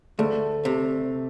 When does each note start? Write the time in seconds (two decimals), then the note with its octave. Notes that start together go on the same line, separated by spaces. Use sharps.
0.19 D2 A3
0.65 C3